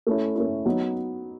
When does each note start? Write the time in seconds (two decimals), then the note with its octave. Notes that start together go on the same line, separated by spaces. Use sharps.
0.07 A3 C#4 E4
0.36 A3 C#4 E4
0.66 F#3 B3 D#4